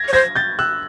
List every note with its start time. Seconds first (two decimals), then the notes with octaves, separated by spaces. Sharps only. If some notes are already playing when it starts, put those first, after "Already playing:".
Already playing: G#6 A#6
0.08 C#5
0.13 C5 G#6 A#6
0.35 G6 A6
0.59 E6 F#6